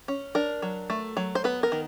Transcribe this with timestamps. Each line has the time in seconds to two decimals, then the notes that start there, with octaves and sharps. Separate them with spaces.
0.08 C#4
0.35 D4 A#4
0.62 F#3
0.90 A3
1.17 F#3
1.35 C5
1.44 B3 B4
1.63 A#4
1.72 D#3